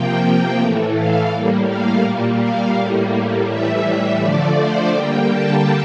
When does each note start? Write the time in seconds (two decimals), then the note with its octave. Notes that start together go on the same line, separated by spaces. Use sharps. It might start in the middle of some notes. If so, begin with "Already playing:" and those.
Already playing: C3 F3 A#3 G5
0.25 G5
0.60 A2 E3 A3
0.96 F5
1.33 A2 G3 A#3
1.69 F5
2.04 A#2 G3 A#3
2.40 F5
2.77 A2 G3 A#3
3.48 A2 E3 G3 E5
4.20 D3 F3 A3 D5
4.57 C5
4.92 D3 G3 A#3 G5
5.29 A5